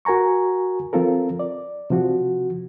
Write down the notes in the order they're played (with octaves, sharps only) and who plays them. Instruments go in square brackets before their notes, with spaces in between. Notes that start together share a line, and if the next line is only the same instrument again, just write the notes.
[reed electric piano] F#4 A#4 G#5 A#5 C#6
F3 C4 F4 A4 A#4
D5
C3 F3 F#4